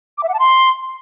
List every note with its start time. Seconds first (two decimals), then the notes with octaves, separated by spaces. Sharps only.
0.18 D6
0.23 E5
0.29 F#5
0.34 A5
0.39 C6